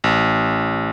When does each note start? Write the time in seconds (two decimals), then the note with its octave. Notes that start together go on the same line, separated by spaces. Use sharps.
0.04 A1